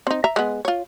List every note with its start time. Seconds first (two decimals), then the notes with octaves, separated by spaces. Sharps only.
0.07 C4 D#4
0.24 E5 A#5
0.36 G#3 B3
0.65 F4 C#5